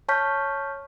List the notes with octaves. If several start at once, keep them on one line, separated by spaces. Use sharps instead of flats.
C#5 A5 C#6 F6 G6 B6